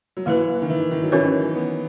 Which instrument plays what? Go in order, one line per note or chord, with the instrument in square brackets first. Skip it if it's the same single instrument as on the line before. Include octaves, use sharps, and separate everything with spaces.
[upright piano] F#3
[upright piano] E3 [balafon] A#3 E4 B4
[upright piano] D#3
E3
D#3
F#3
[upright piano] E3 [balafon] C#4 F#4 A#4 C#5
[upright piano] B3